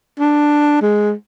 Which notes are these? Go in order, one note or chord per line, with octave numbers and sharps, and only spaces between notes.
D4
G#3